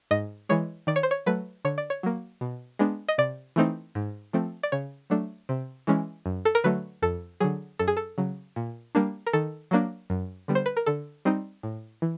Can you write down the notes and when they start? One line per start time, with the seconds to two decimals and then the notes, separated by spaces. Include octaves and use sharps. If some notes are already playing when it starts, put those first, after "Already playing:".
0.11 G#2 D#5
0.49 E3 G#3 C#5
0.87 D#3 D5
0.96 C#5
1.03 C5
1.11 C#5
1.26 F#3 A3 B4
1.65 D3 C#5
1.78 D5
1.90 C#5
2.03 F#3 A#3
2.41 B2
2.79 G#3 B3 D4
3.09 D#5
3.18 C3 D5
3.56 E3 A3 C4 D#4
3.95 G#2
4.33 F3 A3 C4
4.63 D5
4.72 C#3 C#5
5.10 F#3 A3 D4
5.49 C3
5.87 E3 G#3 C#4
6.26 F#2
6.45 A4
6.55 A#4
6.64 D3 F#3 A3 B4
7.02 F2 A4
7.40 D3 F#3 G#4
7.79 F#2 A4
7.88 G#4
7.97 A4
8.18 C#3 F#3
8.56 A#2
8.95 G3 A#3 D4
9.27 A#4
9.33 D#3 A4
9.71 F#3 A#3 D4
10.10 F#2
10.48 D3 G3 B3
10.55 C5
10.66 B4
10.77 A#4
10.86 D3 A4
11.25 G3 C4 D#4
11.63 A2
12.02 E3